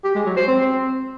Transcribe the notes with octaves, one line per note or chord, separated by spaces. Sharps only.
G4
G#3
F#3
C5
C4